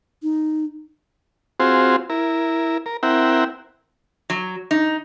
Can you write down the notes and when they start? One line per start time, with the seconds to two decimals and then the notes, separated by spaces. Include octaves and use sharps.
0.23 D#4
1.60 C4 F4 F#4 G#4 C5
2.10 E4 A#4
2.86 A#4
3.03 C4 E4 A#4 E5 F#5 G5
4.30 F#3
4.71 D#4